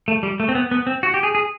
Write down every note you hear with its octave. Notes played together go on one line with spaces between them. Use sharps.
A3
G3
A3
C4
B3
B3
C4
F#4
G4
G#4
G#4